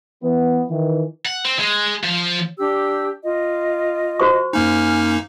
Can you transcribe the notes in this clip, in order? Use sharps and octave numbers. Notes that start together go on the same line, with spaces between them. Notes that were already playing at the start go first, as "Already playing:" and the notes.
E3 B3
D#3 E3
F#5
C4
G#3
F3
D4 G4 E6
F4 D#5
F#4 C5 C#6
F#2 A#3 D#4 G#5 F6